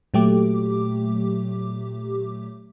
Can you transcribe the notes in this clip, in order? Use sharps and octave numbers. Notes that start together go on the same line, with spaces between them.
A#2 F#3 A3 G4 D6